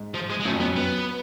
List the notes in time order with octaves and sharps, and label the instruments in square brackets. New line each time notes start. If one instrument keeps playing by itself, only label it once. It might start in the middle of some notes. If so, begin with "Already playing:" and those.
Already playing: [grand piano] G#2
[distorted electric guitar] F3
G#3
G#3
[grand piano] F#2 [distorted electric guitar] A3
[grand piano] F2
[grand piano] F#2 [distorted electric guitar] B3
[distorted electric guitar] B3